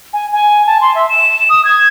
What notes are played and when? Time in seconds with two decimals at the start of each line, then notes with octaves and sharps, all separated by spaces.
0.13 G#5
0.32 G#5
0.67 A5
0.81 C6
0.95 E5
1.09 E7
1.49 D#6
1.65 G#6